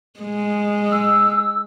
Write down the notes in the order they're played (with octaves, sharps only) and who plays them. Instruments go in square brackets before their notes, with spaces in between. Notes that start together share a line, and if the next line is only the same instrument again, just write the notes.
[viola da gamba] G#3
[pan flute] E6